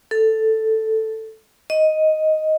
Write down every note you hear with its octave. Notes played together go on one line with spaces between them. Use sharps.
A4
D#5